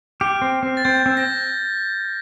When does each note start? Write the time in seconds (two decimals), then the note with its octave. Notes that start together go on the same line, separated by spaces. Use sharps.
0.20 G4 F6
0.42 C4
0.63 C4
0.77 A6
0.85 C4 G6
1.06 C4
1.17 A#6